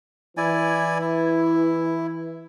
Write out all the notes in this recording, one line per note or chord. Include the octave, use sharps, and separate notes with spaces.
E3 E4 D5 G#5
E4